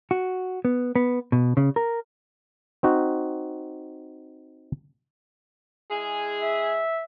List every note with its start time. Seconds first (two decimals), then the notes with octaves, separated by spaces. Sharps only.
0.11 F#4
0.65 B3
0.95 B3
1.32 B2
1.57 C#3
1.76 A#4
2.83 C4 D#4 F#4
5.91 G#3 E4 G#4
6.40 E5